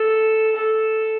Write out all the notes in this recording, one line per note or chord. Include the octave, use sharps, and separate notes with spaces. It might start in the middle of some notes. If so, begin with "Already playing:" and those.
Already playing: A4
A4